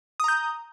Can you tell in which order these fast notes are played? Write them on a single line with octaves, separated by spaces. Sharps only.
D#6 A#5 G6